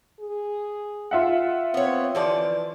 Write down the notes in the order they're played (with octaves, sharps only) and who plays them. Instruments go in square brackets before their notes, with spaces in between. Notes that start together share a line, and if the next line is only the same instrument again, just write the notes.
[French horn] G#4
[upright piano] F4 E5 F#5
[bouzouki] B3 C#5 [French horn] C4
[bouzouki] D3 F3 D5 [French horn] E3